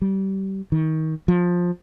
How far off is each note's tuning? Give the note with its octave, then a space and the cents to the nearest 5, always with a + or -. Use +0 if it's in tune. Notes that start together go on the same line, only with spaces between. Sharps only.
G3 -25
D#3 +25
F3 +15